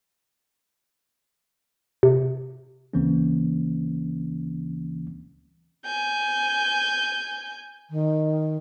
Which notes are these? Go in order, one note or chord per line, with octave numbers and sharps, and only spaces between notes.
C3
D2 C#3 E3 A#3 C4 C#4
G#5 G6
D#3